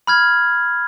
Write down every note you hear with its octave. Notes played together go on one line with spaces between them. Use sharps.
B5 F6 G#6